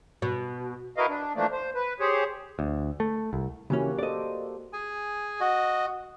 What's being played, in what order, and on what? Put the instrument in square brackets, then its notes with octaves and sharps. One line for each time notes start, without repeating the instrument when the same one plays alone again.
[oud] B2
[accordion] E4 F#4 A#4 B4 D#5 F5
D4
E3 F3 A3 A#3 D4
C5
B4
G4 G#4 C5 C#5
[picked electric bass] D2
A3
C2
[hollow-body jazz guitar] C#3 E3 C#4 [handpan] A#3 F#4 G4
[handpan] A4 C5 [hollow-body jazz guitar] D5 D#5
[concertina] G#4 G#5
F#4 D#5